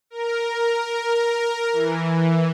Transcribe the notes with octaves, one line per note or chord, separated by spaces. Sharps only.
A#4
E3